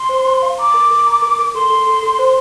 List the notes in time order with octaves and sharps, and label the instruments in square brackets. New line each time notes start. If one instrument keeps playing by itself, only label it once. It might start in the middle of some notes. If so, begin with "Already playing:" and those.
Already playing: [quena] C6
[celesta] C5
C5
F5
[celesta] A#5 [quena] D6
[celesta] A#4
A#4
A#5
A#4
A#4
[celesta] A4 [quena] C6
[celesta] A4
A4
A4
C5